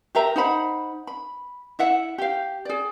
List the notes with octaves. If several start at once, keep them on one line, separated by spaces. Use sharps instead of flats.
G4 A#4 E5 A#5
D#4 C5 F#5 B5
B5
E4 E5 F#5
G4 F5
G#4 D5